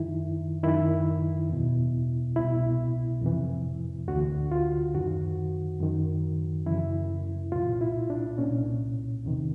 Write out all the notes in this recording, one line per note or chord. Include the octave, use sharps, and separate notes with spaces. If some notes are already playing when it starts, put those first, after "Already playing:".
Already playing: F#2 D#3 E4
F#2 D#3 E4
E2 B2
C2 B2 E4
F2 C3 E3
D2 D3 F#4
F4
F#2 D#3 F#4
F#2 D#3
F#2 C#3 E3 E4
C2 A#2 F4
E4
D4
C2 A#2 C#4
E2 C3 D#3